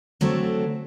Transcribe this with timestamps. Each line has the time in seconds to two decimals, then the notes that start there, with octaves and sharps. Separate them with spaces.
0.21 D3 F#3 A3 C4